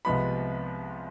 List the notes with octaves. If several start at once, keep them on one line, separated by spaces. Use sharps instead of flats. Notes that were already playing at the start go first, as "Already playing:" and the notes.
C2 C3 F3 G#3 B3 B5